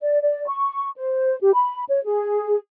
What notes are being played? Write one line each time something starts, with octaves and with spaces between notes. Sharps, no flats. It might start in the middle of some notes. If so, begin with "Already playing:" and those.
D5
D5
C#6
C5
G4
B5
C#5
G#4